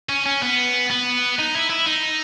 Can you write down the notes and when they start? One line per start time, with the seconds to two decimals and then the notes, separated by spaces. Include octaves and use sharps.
0.09 C#4
0.25 C#4
0.42 B3
0.90 B3
1.39 D#4
1.55 E4
1.70 E4
1.87 D#4